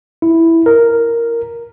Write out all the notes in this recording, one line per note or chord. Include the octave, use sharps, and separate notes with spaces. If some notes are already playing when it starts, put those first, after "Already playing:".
E4
A#4